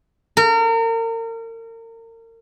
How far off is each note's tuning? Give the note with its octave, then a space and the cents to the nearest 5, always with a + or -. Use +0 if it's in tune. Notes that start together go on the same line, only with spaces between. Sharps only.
A#4 -35